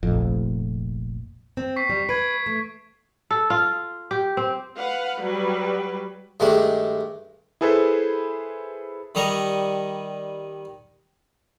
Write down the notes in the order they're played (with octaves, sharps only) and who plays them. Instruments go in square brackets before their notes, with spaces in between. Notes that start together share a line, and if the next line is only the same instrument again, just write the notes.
[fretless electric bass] F1 F2 [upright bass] A#1
[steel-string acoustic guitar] C4
[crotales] C#6 B6 C7
[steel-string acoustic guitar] G3
[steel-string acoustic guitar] B4 [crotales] G#6 D7
[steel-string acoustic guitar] A3
[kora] A4
F4
G4
C4
[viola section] B4 F5 F#5
F#3 G3 B4
[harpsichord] G2 D#3 G#3 A3 D4
[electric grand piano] E4 G#4 A4 B4 C5
[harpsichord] D#3 G3 D#5 A#5 C#6